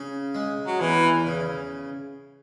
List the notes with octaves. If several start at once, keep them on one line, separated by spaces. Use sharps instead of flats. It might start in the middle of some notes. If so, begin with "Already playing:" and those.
Already playing: C#3
G#3
F#3
E2 E3
C#3